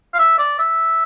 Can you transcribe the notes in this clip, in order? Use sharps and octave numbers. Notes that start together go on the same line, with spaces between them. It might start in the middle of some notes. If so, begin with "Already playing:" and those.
F5
E5
D5
E5